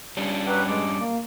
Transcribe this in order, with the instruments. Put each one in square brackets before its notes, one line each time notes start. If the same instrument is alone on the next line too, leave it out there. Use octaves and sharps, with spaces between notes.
[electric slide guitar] G3 C#4 D4
[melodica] F#3 G4 F#5 [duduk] B4
[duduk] G#3 [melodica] D5
[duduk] A#3